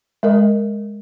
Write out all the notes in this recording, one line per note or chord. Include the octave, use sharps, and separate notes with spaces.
G#3 A#4 D#5